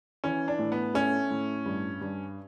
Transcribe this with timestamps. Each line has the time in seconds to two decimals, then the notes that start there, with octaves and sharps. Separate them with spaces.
0.24 E3 C#4
0.48 D4
0.59 A2
0.72 B3
0.94 A3 C#4
1.31 A2
1.65 G2
2.01 G2